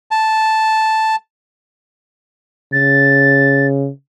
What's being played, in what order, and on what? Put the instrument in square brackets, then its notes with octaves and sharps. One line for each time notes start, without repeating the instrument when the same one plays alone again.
[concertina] A5
[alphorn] C#3 [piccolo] A6